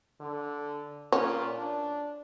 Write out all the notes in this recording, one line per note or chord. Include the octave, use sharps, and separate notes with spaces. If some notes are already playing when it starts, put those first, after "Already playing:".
D3
A#2 C#4
D4